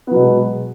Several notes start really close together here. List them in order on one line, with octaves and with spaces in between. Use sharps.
B3 F#3 B2 G#3